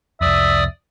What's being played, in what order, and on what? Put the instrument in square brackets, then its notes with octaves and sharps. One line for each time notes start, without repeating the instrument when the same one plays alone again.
[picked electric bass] C2 F2 [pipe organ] D5 D#6 [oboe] E5